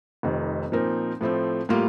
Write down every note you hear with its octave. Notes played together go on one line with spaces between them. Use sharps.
F1 F2 C3 D#3
A#2 F3 C4 D#4 A#4
A2 F3 A3 C4
A2 G3 A#3 F4